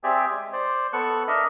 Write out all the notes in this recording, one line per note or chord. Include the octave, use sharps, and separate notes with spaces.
C4 G4 G#4 D5 E5
G#3
C5 D5
B3 A4 C#6 F#6
D4 A#4 D#5 E5